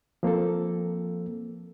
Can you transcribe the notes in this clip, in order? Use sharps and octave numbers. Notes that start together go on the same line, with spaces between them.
F3 A#3 C4 A4